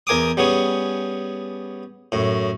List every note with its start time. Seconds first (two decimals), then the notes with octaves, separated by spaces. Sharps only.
0.07 E2 A#4 G#5 D6 D#6
0.37 G3 B3 C#4 G#4
2.12 F#2 A2